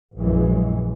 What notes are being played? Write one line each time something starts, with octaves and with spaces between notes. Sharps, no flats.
A#1 F#2 E3 G#3